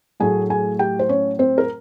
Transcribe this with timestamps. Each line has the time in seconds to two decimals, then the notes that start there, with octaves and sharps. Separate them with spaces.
0.20 A2 F#3 A3 G#4 G#5
0.50 G#4 G#5
0.79 G4 G5
0.99 C5
1.09 C#4 C#5
1.39 C4 C5
1.58 A#4